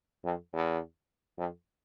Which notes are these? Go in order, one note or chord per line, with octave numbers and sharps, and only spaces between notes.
F2
E2
F2